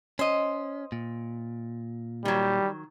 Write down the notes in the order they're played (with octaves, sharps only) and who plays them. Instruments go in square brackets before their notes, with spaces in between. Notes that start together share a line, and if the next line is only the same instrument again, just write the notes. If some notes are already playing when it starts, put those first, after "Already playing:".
[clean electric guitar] C#4 [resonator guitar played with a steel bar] C5 D#5
[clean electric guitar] A#2
[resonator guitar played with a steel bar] D#3 F#3 [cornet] G3